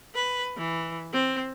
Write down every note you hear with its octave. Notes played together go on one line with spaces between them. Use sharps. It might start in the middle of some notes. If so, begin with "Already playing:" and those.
B4
E3
C4